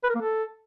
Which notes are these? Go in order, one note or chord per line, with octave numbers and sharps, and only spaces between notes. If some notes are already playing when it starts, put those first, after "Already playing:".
B4
A#4
A#3
A4